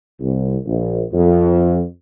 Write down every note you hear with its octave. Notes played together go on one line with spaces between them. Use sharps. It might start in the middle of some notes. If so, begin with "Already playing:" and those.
C2
A#1
F2